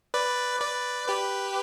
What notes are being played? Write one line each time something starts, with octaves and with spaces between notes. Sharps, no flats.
B4 D5
B4 D5
G4 B4